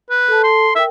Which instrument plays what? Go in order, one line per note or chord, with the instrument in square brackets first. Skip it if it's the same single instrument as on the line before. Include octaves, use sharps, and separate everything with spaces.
[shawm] B4
[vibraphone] A4 A5
[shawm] C6
[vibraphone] A#4 G5 [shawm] E5